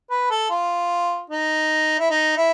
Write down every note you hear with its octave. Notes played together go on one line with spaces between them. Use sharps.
B4
A4
F4
D#4
E4
D#4
E4